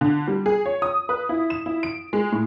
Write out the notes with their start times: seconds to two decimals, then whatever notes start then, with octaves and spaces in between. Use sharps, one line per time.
0.01 D3
0.28 G3
0.46 G#4
0.66 C#5
0.82 D#6
1.09 B4
1.29 E4
1.50 E7
1.66 E4
1.83 D7
2.13 G#3
2.32 A2